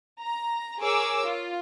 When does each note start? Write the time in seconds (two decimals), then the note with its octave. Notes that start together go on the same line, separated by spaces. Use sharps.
0.19 A#5
0.80 G#4 A#4 C#5 D6 E6
1.26 F4